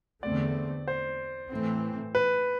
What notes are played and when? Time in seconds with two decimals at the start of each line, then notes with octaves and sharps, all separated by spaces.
0.23 E2 D3 A3 C4 D5
0.88 C5
1.51 A2 E3 A3 C4
2.15 B4